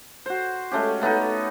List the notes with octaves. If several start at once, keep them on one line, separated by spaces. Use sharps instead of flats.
F#4 C5
G#3 A3 C#4 G4
A3 B3 C#4 D#4